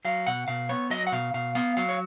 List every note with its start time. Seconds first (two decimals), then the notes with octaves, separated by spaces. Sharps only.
0.05 F#3 F5
0.27 B2 F#5
0.48 B2 F5
0.69 B3 C#5
0.90 F#3 D#5
1.07 F#5
1.12 B2 F5
1.34 B2 F5
1.55 B3 F5
1.77 F#3 F5
1.89 C#5